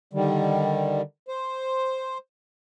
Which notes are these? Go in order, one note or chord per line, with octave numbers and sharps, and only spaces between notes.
D3 D#3 G3
C5